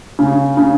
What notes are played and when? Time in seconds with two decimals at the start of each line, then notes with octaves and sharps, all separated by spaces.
0.19 C#3
0.57 C#3